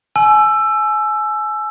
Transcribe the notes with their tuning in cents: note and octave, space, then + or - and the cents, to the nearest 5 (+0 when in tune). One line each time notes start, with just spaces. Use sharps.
G#5 +35 E6 +15